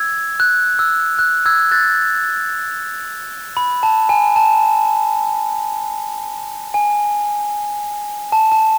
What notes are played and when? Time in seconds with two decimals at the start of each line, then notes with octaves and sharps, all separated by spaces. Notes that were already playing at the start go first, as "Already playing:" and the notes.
Already playing: E6 G#6
0.40 F#6
0.79 E6
1.19 F#6
1.46 E6 G#6
1.71 F#6 A6
3.57 B5
3.83 A5
4.09 G#5
4.36 A5
6.74 G#5
8.32 A5
8.52 A5